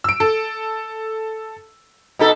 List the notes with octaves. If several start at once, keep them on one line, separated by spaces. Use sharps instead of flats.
E6 D7
A4
B2 D#4 A4